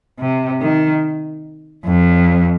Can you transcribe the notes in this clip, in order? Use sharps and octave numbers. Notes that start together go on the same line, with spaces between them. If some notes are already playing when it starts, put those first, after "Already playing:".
C3
D#3
F2